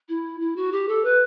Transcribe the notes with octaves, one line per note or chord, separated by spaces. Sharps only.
E4
E4
F#4
G4
A4
B4